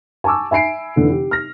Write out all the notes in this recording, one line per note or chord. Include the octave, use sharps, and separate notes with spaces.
G#5 A5 C#6 D6 E6
E5 G#5 B5 C7 D7
F1 D3 E3
G4
F6 A#6